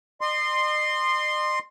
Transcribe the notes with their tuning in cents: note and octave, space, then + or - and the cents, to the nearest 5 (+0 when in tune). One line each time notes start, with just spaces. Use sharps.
D#5 -40 C6 +0